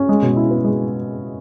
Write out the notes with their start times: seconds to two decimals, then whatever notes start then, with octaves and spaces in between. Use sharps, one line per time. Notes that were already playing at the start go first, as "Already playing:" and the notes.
Already playing: C#4
0.09 G#3
0.22 B2
0.36 E4
0.51 B3
0.65 G#3